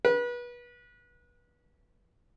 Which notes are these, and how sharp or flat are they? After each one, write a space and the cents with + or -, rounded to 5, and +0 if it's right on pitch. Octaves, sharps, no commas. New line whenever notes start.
B4 -30